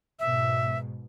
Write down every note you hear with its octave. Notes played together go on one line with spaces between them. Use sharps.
G#2 B2 E5